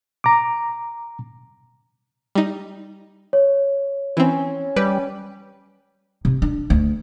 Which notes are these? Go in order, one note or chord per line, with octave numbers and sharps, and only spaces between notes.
A#5 D6
G3 D#4
C#5
E3 C4 C#4
G3 B4
C3
D4
D2